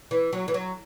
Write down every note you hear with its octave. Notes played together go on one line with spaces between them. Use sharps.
E3
F#3
E3
F#3